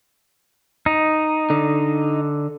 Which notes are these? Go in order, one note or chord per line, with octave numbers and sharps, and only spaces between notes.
D#4
D3